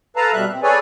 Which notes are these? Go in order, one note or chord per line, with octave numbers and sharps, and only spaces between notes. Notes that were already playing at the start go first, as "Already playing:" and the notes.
A4 B4 F5 A5 A#5
B2 G3 E5 F#6
C4
G#4 A4 B4 C#5 D5 G#5